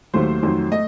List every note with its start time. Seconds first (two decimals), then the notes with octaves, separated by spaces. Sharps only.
0.13 D#2 D#3 F#3 A3 C5
0.43 F2 D#3 F#3 A3
0.71 A3 D#5